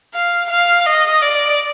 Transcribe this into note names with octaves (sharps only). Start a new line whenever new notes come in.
F5
F5
D#5
D5